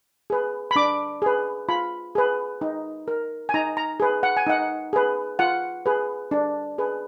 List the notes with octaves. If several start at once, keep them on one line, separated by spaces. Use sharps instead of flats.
G#4 B4
B5
D4 D6
G#4 B4
F4 B5
G#4 B4
D#4
A#4
G#5
D#4 A#5
A#5
G#4 B4
F#5
G#5
D#4 F#5
G#4 B4
F4 F#5
G#4 B4
D4
G#4 B4